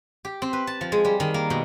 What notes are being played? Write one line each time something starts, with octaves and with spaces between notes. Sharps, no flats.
G4
C4
B4
A5
F3
G#3
G3
D#3
A#3
B2